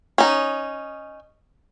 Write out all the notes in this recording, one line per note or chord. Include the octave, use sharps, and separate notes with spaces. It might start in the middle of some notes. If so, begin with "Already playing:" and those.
C#4 D#4